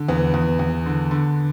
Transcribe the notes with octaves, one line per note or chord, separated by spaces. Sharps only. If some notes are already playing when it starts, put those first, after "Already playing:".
Already playing: D3
E2 B3
E2
E2
D3
D3